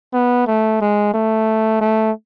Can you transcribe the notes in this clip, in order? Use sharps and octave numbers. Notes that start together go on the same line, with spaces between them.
B3
A3
G#3
A3
A3